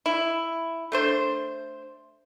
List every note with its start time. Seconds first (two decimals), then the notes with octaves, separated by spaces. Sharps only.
0.06 E4
0.92 A3 D4 C5